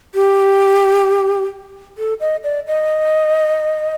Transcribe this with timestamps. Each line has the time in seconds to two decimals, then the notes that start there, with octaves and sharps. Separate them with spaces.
0.15 G4
1.98 A4
2.20 D#5
2.44 D5
2.67 D#5